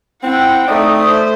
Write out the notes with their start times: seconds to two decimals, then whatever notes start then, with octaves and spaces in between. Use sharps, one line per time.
0.23 C4 E4 F#5 G5
0.68 A3 C4 D#4 D5 D#6
1.02 C5